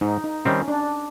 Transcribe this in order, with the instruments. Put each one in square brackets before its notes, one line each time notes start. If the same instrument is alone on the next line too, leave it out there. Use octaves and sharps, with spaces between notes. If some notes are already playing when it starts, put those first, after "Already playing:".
[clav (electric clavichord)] G#2 [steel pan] D#4
[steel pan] D#4
[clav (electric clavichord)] D#3 G3 C4 [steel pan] C#4
[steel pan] D4